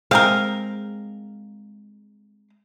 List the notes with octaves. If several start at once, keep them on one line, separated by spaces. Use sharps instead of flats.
G#3 C4 G#4 A#4 F5